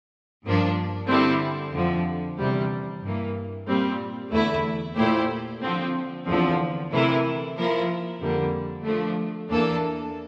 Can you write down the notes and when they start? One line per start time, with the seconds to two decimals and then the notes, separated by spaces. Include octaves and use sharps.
0.45 G2 F3 A#3 D4
1.09 D3 G3 C4 E4
1.74 F2 D3 F3
2.38 E2 C3 G3
3.03 G2 E3 A#3
3.67 A#2 G3 C4
4.32 E2 D3 A3 E4
4.97 A#2 A3 E4 G4 C5
5.61 D3 F3 C4
6.26 E2 D3 F3 C4
6.91 C3 E3 A3 E4 A#4
7.56 F3 A#3 E4 A#4
8.21 F2 D3 G3 A#3
8.84 F3 A3 D4
9.50 E2 E3 A#3 D4 A4